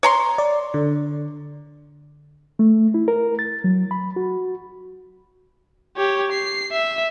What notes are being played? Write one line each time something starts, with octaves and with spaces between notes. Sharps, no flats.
C#5 A#5 C6
D5
D3
A3
E4
A#4
A6
F#3
B5
F#4
G4 C#5
C7
E5